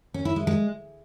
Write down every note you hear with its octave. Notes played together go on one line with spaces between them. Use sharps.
C#4
E4
G#3
G#3